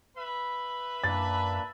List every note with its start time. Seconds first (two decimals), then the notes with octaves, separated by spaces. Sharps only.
0.17 B4 E5 B5
1.04 F#2 A#2 A#3 D4 A6